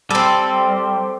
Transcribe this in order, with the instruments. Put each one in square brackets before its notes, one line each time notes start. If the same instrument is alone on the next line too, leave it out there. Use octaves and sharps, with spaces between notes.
[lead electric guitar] G3 [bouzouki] C4 A4